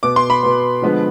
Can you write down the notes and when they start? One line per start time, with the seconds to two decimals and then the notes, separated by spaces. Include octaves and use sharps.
0.03 B2 B3 D6
0.16 C6
0.30 B5
0.43 B2 B3
0.82 D3 F3 G#3 B3